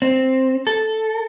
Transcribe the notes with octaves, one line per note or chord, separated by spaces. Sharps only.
C4
A4